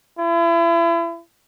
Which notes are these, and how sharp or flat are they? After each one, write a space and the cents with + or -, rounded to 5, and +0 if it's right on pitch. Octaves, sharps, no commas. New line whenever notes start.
E4 +35